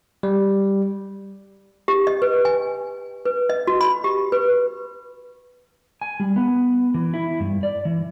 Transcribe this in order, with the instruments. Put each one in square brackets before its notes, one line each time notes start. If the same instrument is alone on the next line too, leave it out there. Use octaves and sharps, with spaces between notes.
[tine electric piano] G3
[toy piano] G4
D#5
B4
G#5
B4
D#5
F#4
B5
G4
B4
[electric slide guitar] G#5
G3
B3
E3
E4
G2
D5
E3